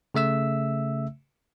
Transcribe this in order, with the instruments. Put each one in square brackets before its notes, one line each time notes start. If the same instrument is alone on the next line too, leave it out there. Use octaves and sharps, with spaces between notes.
[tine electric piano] C#3 A3 E5 E6